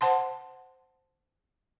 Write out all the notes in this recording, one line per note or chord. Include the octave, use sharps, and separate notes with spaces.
C5 F#5 A5 C6